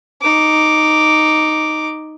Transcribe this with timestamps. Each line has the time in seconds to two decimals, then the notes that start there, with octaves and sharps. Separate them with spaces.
0.22 D#4 D6